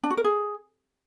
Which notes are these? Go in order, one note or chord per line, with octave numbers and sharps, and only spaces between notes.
D4
F#4
A#4
G#4